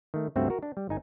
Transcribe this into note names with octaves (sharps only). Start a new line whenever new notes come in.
D#3 A3
C#2 G2 A3 C4 F#4 E5
F#4 A#4
D4
G3
G1 D#4 G#5